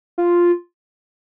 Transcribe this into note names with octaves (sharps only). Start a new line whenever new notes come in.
F4